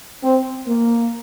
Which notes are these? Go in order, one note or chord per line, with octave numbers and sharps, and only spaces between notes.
C4
A#3